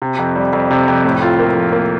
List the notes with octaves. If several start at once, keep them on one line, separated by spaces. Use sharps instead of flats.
C3
F2
G3
F2
C3
F2
A2
F4
A#3
F3
A#3